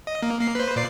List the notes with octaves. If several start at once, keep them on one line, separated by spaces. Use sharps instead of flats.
D#5
A#3
A#3 C7
B4 C5
A#2 D5 C7